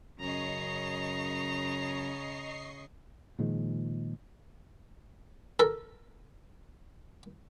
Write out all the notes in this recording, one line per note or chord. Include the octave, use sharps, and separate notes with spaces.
F#2 C#3 D#5 A#5 C#6 C7
A#2 D#3 F3 G#3
A4 A#4